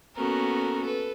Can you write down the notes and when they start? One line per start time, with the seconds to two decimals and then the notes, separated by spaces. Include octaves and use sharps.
0.16 A#3 B3 C#4 F#4 A4 A#4
0.82 A4 B4